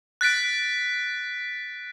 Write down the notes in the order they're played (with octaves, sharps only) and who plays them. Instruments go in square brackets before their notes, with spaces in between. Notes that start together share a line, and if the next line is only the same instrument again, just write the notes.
[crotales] F#6 A6 B6 D7